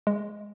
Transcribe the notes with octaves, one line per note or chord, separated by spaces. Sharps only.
G#3